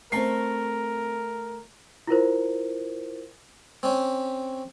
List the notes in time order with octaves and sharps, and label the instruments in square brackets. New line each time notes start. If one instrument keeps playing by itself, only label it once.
[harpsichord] A3 C#6 [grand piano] C4 A#5 C7 [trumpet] A#4
[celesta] E4 F4 A#4 C5
[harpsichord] C4 C#4